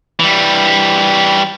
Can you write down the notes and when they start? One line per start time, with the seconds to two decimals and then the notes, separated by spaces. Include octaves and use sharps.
0.19 E3 G3